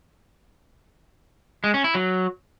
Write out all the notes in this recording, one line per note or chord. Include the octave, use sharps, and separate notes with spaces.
G#3
C#4
E4
F#3